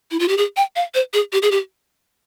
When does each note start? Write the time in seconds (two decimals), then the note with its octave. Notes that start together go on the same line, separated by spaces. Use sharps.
0.11 E4
0.19 F4
0.28 G4
0.37 G#4
0.57 G5
0.76 F5
0.94 C5
1.14 G#4
1.32 G4
1.42 G#4
1.51 G4